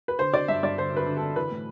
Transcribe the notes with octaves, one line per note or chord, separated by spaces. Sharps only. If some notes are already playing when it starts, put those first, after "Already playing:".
B4
D3 C5
D3 D5
G2 E5
G2 D5
D3 C5
D3 B4
D3
D3 A4
E3 B4
A2